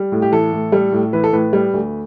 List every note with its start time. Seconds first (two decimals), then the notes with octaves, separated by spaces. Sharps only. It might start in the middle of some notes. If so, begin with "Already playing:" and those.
Already playing: G3
0.12 A2
0.22 G4
0.32 E3 A4
0.52 A2
0.72 G3
0.92 A2
1.13 E3 B4
1.24 A4
1.33 A2 B4
1.53 G3
1.74 D2